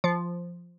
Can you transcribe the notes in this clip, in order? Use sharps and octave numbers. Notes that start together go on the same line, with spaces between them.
F3